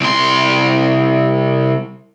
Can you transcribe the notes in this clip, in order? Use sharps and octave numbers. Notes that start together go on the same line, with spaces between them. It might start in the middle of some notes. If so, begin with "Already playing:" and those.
C2 C6